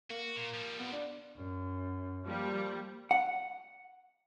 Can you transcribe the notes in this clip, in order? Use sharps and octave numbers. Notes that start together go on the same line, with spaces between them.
A#3 F#4
A#2
F3 G3
B3
D4
F#2
F3 G3 A#3
F#5